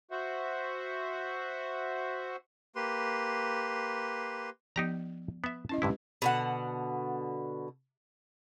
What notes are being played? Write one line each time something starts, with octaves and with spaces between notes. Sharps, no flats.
F#4 C5 E5 F#5
A#3 G4 B4 C6
F3 B3 D#4 G4 A#5
B3 E5
C#4 E4 D#5 A5
G2 D3 G#3 E4 G4 B4
B2 D3 F#5